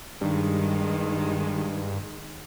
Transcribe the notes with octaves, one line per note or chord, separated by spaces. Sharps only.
G2 D#3 G#3